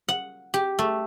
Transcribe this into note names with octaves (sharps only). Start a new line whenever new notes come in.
F#5
G4
A3